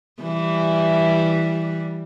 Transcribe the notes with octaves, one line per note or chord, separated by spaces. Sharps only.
E3 G3